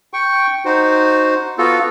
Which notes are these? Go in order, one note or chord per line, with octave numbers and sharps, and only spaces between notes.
G5 C#6
D#4 F#4 C5
B3 F4 F#4 A4